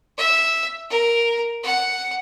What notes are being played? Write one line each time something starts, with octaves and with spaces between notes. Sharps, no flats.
E5
A#4
F#5